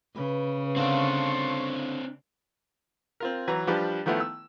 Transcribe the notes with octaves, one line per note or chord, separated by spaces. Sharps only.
C#3 B4
D3 C4 D4 F5 A5 C6 C#6
C4 F4 A#4
E3 F#3 B4 A#5
F3 G3 D4 G4 B4
D#3 F3 A3 B3 E4
E6